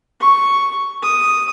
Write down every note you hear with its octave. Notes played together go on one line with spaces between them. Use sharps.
C#6
D#6